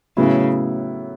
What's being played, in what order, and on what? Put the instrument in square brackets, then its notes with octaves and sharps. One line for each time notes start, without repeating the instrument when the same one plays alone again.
[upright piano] A2 F#3 B3 E4 [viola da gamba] C#3